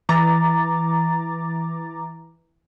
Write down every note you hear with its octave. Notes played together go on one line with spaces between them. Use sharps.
E3 A#5 D6 A6